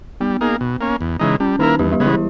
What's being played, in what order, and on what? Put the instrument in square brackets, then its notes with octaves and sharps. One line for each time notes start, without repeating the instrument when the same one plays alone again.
[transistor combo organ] G3 [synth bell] B3
[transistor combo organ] A#3 D#4 G#4
B2
A#3 C#4
E2
C#3 E3 G#3 D#4
[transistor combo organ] G3 [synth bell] C#4
[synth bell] D#3 D#4 [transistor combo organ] A#3 E4 A#4
[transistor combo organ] E2 [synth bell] G3 G4
[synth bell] G3 G4
[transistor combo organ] C#3 G#3 B3
[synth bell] E3 E4